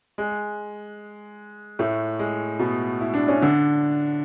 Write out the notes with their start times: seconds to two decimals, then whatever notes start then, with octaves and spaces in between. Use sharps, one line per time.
0.18 G#3
1.79 A2 A3
2.19 G#3
2.59 B2 B3
3.01 E4
3.14 D4
3.28 C#4
3.42 D3 D4